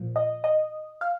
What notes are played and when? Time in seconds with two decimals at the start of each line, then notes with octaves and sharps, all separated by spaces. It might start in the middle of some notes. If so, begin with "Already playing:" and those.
Already playing: A#2 F3
0.16 D#5
0.44 D#5
1.01 F5